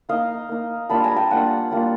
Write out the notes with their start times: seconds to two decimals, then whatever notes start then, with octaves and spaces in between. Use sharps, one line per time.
0.09 A#3 D#4 D#5 F5
0.49 A#3 D#4
0.89 G3 A#3 D4 F4 A5 B5
1.03 G#5 A#5
1.16 G5 A5
1.30 G3 A#3 D4 F4 F#5 G#5
1.71 G3 A#3 D4 F4